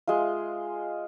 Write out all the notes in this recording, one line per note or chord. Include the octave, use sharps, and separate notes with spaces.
G#3 F4